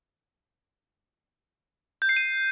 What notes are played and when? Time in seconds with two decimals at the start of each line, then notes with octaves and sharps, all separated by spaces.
2.02 G6
2.09 C7
2.17 D#7